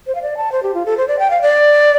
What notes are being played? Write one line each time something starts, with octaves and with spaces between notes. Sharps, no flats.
C5
F5
D5
A5
C5
G4
F4
A4
C5
D5
G5
F5
D5